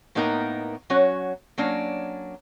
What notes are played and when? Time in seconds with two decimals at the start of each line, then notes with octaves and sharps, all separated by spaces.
0.15 A2 A#3 B3 D#4 A#4 A#5
0.90 F#3 C#4 F#4 C#5
1.58 F#3 A#3 C#4 D4